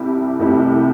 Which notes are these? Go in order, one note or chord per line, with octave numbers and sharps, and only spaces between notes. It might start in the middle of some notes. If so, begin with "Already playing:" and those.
Already playing: C2 C3 E4 G4
C2 C3 A3 E4 G4